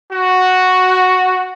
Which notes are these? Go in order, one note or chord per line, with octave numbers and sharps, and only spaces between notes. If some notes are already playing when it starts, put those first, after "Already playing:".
F#4